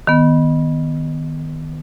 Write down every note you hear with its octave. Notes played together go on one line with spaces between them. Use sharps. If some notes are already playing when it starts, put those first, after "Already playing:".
D#3 B3